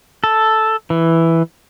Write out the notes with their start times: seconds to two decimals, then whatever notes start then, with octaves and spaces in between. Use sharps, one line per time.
0.24 A4
0.90 E3